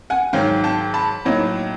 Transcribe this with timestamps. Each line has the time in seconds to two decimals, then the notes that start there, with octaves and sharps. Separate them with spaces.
0.10 F#5 G#5
0.33 G#2 D#3 F#3 F5 G5
0.64 G5 A5
0.94 A5 B5
1.25 A2 F#3 A#3 D#4